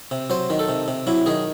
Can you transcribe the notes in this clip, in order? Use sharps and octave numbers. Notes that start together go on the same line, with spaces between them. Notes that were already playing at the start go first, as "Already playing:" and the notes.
C3
F#3 C5
D#3
A4
C3
C3
F#3 E4
D#3 G#4